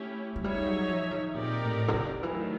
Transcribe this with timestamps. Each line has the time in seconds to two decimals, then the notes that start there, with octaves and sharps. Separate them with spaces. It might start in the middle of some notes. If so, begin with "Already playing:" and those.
Already playing: A3 C#4 E4 G4
0.36 F#3
0.44 G3 D#4 G#4 C#5 E5
0.67 F#3
0.89 F3
1.11 D#3
1.34 A#2 C4 D#4 G4 A#4 D5
1.64 A2
1.88 D3
1.93 D#3
2.23 D#3 E3 F#3 A3